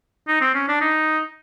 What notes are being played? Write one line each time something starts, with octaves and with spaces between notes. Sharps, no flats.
D#4
C4
C#4
D4
D#4